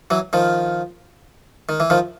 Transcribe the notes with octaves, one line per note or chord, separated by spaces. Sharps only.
E3 F#3
D#3 F3
D#3
E3
D#3 F3